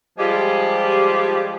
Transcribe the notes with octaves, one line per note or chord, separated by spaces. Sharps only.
F3 G3 G#3 F4 G4